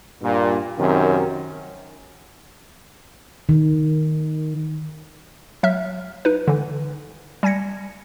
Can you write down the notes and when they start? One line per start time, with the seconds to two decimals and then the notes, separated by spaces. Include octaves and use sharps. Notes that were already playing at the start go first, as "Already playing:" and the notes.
0.23 G2 A#2
0.79 F#2 C3 D#3
3.49 D#3
5.63 F#3 E5 F6
6.25 D#4 B4
6.48 D3 E3
7.43 G3 G#5 G#6 A#6 C#7